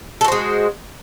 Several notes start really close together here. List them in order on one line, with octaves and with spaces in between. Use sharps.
A4 F#4 C5 G#3